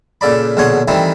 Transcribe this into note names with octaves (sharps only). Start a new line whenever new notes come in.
A#2 C#3 A4 D5 B5
A#1 B2 D3 G#4 C#5 C6
D#3 E3 G3 A3 C4 D#4